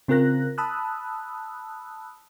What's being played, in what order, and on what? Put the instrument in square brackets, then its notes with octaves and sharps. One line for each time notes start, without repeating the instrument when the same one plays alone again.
[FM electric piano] C#3 C4 F4 A#4 F#6 A#6
A5 B5 D#6 E6 F#6